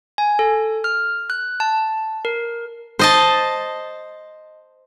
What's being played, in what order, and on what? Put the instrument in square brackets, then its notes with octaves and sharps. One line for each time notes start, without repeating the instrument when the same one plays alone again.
[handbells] G#5
A4
F6
F#6
A5
A#4
[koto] C5 D#5 A5